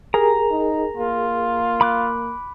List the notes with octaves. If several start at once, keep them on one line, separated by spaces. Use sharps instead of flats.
G4 G#4 A#4 A#5
D#4
A#3 F4
B5 D6 F#6